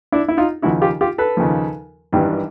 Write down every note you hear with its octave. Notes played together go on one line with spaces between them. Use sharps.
D4 E4
E4
D#4 F4
D#2 C#3 F3 E4 F#4
F4 G4
F4 G4
A4 B4
D#2 C#3 F3
G#1 G2 E3 G3